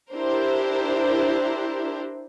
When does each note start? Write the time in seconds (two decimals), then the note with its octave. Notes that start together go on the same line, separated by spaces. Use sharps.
0.13 D4 E4 G4 A#4 C5